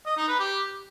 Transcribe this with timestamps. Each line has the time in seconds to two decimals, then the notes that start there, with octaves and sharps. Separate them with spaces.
0.06 D#5
0.17 D#4
0.28 B4
0.40 G4